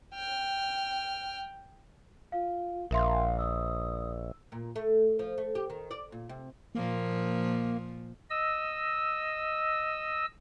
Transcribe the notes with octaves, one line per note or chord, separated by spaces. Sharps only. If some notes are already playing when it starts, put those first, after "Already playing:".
G5 F6
F4 F5
A#1 A#4 E5 F5 C6
D#6 E6
A#2
A3
F3
A3
G4
D#3
D5
A#2
C3
A#2 F3 A#3
D#5 E6